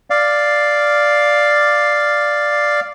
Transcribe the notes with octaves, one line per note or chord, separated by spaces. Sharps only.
D5 F5